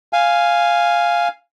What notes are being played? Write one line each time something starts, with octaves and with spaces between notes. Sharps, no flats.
F5 G#5